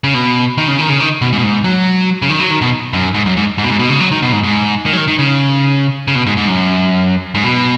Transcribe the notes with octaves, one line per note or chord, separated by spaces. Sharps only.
C#3
B2
D#3
C#3
D#3
C#3
D#3
B2
G#2
B2
G#2
F#3
C#3
D#3
F#3
D#3
B2
F#2
G#2
F#2
G#2
G#2
B2
G#2
B2
C#3
F#3
D#3
B2
G#2
G#2
D#3
F#3
D#3
D#3
C#3
C#3
B2
G#2
G#2
F#2
G#2
B2